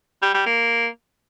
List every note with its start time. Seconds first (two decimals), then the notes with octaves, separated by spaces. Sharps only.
0.22 G3
0.34 G3
0.46 A#3